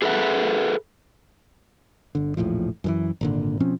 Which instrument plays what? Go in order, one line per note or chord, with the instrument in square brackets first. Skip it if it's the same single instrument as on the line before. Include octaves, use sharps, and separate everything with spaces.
[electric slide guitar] G#4 A4 B4 C#5 E5 F#5
[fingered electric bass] G1 D3
E1 A#1 A2 F3
F#2 D#3 E3
G#1 A#2 D3
B2 F3 C4 C#4